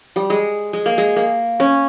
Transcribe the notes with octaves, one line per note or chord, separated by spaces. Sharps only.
G3
G#3
G#3
A#3
G#3
A#3
C#4